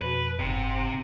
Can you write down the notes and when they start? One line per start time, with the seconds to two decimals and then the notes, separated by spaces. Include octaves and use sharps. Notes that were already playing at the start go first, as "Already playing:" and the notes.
0.01 F2 B2 B4
0.39 F#1 G#2 C3